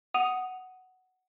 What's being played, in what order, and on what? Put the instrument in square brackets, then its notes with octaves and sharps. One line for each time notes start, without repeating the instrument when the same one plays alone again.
[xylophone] F#5 D#6 D#7 F7